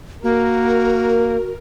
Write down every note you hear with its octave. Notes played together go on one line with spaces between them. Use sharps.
A#3 F#4 A#4